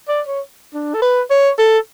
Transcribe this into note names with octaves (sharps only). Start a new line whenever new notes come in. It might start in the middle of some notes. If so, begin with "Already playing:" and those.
D5
C#5
D4
A4
B4
C#5
A4